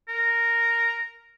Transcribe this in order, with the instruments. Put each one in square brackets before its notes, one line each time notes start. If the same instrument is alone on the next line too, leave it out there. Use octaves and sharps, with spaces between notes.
[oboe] A#4